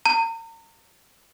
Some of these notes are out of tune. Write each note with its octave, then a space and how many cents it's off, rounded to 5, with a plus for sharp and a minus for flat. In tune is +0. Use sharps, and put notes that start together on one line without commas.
A#5 -40